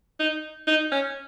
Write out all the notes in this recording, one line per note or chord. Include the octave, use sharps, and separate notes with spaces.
D#4
D#4
C#4